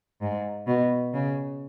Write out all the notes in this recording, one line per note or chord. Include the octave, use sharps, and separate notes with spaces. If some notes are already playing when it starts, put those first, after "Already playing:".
G#2
B2
C#3